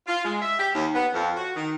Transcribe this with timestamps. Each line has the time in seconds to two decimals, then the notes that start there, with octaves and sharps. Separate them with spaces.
0.07 F4
0.25 G#3
0.42 E5
0.59 G4
0.75 D#2
0.94 B3
1.14 F2
1.36 F#4
1.55 D#3